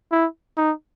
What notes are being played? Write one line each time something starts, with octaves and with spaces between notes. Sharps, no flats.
E4
D#4